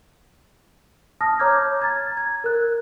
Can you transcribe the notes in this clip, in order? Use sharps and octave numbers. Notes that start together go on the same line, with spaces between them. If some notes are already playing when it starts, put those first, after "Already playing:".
A5 D#6 F6 A#6
C#5 A#5 D6 F6 G6 G#6
A#5 G#6 A6
G#6
A#4 F#6